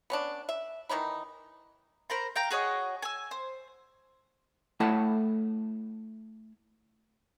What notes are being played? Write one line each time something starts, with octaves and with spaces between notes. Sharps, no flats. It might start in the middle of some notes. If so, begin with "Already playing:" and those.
B3 C#4 D4
E5
D#3 E3 D#4 B5
A#4 C5 A#5 B5
F5 G5 A#5
F#4 G#4 C#5 D#5
G#5 E6
C5
A3 E4 A4 C#5 F#5 A5